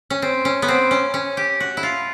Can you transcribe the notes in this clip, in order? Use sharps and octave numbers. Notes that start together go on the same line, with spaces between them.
C#4
C4
C#4
B3
C4
C#4
C#4
G4
F#4
E4
F4